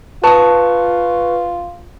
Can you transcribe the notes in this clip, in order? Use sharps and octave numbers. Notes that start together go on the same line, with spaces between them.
F4 B4 A5 C#6 D#6